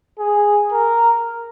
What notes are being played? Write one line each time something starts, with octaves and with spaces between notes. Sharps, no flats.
G#4
A#4